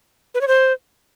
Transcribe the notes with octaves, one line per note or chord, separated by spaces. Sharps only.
B4
C#5
C5